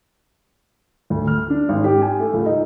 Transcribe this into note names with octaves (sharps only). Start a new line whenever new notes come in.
D2
F6
D4
G#1
G4
G#5
A3
C#2
D#4